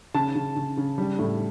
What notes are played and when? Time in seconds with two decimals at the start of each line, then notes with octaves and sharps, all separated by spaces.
0.14 C#3 A5
0.36 C#3
0.56 C#3
0.77 C#3
0.98 G3
1.19 A2